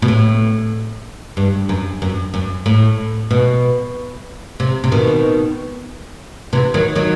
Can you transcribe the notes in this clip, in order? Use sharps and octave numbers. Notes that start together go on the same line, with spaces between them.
B2
A2
G2
F#2
F#2
F#2
A2
B2
C3
C3
B2 D#3
C3 E3
D#3 F#3
D#3 F#3